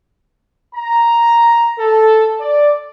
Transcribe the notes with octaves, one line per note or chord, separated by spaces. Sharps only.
A#5
A4
D5